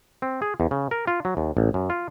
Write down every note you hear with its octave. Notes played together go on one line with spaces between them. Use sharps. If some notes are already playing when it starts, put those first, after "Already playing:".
C4
G#4
E2
C#3
A#4
F4
F#3
D#2
A1
F#2
F4